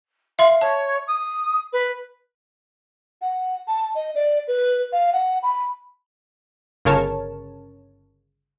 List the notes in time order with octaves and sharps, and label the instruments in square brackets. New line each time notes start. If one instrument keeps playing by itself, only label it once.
[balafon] E5 C6 [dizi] F5
[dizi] C#5 [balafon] A5
[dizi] D#6
B4
F#5
A5
D#5
D5
B4
F5
F#5
B5
[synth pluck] G1 C#3 A#4 C#5 A5